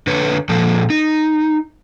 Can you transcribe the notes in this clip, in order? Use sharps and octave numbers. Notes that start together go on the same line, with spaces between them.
D3 B4 C#5
A#2 F3 A4
D#4